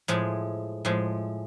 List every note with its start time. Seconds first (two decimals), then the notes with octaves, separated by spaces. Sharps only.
0.08 A2 F3 G#3
0.85 A2 F3 G#3